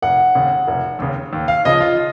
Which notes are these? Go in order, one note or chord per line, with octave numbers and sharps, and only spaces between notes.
F1 F#5
D#2 C#3
F1
D#2 C#3
D#2
F5
C#3 F3 D#5
F4